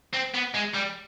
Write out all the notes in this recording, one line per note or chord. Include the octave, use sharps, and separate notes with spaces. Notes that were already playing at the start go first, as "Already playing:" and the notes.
C4
B3
G#3
G3